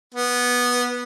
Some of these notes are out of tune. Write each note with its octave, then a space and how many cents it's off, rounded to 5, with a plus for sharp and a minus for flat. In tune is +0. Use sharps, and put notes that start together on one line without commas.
B3 -10